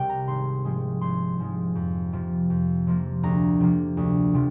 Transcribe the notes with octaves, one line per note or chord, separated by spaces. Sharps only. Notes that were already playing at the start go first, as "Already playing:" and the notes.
Already playing: C2 C3 G3 A#4 G5
A#5
G#1 C6
G#2 F3 G#3
G#1 C6
G#2 F3 G#3
F2
C3 F3 A#3
F2
C3 F3 A#3
D2 A#5
C3 F3 A#3
D2
C3 F3